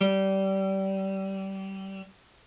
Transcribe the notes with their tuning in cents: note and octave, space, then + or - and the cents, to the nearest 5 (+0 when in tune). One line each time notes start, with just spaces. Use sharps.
G3 -25